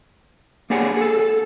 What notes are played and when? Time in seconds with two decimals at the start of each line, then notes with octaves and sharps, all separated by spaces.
0.70 A#3 D4 G4 G#4 C#5 F#5
0.97 G#4 A4
1.19 A4